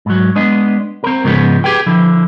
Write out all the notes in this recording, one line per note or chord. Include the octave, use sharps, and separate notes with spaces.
G#2 F#3
G#3 B3 D4 D#5
C4 A#4
G#2 C#3 F3 G#3 B3
G4 G#4 B4 G5
D3 F3 E4